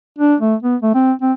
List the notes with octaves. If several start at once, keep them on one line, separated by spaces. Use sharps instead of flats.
D4
A3
B3
A3
C4
C4